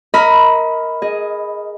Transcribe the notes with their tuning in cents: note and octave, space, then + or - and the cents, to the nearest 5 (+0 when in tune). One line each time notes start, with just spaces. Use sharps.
A#4 +0 D#5 +30 B5 +0
G#4 +0 D#5 +0